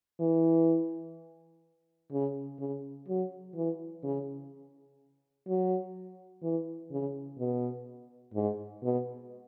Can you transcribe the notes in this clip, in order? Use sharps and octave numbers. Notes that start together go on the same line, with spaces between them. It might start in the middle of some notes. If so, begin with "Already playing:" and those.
E3
C#3
C#3
F#3
E3
C#3
F#3
E3
C#3
B2
G#2
B2